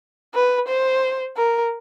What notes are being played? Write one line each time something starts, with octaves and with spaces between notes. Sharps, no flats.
B4
C5
A#4